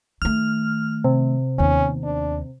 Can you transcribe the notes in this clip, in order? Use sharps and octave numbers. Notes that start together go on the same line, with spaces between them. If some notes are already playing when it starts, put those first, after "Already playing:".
D#3 A3 F6
C3
D#2 B3 C#4
D4